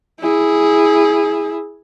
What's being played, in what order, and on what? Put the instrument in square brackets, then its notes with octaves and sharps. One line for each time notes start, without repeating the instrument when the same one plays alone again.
[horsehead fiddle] E4 G#4